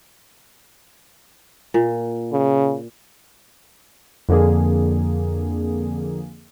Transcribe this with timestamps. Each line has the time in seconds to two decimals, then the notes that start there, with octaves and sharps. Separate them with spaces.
1.74 A#2
2.33 C#3
4.29 F2 D3 A#3 G#4